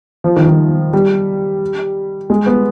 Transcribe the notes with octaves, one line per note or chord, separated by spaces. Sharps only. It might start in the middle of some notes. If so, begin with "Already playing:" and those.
F3
D#3
D#3
G3
G#3
B3